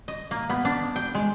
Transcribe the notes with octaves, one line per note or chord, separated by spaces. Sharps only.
D#5
A#3
B3
D4
G5
G#3